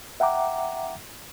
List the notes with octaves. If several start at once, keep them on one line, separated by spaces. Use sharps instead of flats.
E5 F#5 G5 A#5 D6